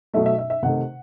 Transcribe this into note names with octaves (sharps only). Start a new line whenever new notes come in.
B2 F#3 A3 E5
E5
E5
E5
C3 D#3 A3 F#5